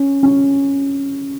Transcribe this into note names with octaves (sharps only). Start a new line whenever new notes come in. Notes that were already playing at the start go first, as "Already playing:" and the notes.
Already playing: C#4
C#4